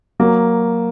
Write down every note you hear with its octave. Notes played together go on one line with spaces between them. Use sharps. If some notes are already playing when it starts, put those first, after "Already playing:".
F#3 A#3